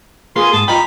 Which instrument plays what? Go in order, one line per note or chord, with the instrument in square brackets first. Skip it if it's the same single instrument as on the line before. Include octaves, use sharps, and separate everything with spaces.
[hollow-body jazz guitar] A#3 F4 B4 [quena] G#4 [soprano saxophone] C6
[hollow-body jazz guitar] G#2 [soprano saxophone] A5 [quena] D#6
[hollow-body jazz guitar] F4 D#5 G5 [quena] A#5 [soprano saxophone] B5